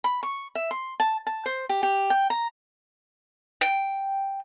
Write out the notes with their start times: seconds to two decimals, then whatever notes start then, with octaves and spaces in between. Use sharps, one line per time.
0.04 B5
0.23 C#6
0.55 E5
0.71 C6
1.00 A5
1.27 A5
1.46 C5
1.69 G4
1.83 G4
2.10 G5
2.30 A#5
3.61 G5